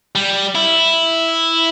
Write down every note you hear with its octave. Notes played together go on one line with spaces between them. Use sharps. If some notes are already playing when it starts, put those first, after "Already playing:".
G3
E4